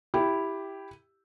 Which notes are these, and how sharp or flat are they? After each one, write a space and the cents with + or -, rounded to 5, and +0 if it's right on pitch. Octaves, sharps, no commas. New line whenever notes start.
E4 +0 G4 +0